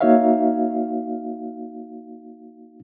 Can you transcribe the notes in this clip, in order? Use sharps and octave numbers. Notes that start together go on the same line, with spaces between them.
A#3 D#4 F#4 C#5 E5 F5